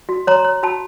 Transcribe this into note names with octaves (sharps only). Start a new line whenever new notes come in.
F#4
C#5 A#5 C6
C#5
F#4 A5 B5